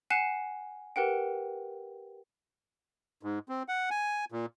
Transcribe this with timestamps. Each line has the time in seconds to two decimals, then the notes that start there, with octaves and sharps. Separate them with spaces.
0.10 F#5 G#5 F#6 C7 E7
0.96 G4 A#4 B4 F#5 G5
3.23 G#2
3.49 C4
3.68 F#5
3.90 G#5
4.32 A#2